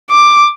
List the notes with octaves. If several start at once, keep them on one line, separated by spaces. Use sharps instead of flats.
D6